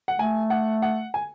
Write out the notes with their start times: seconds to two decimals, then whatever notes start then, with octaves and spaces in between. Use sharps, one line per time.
0.08 F#5
0.19 A3 G#5
0.50 F#5
0.82 F#5
1.14 G#5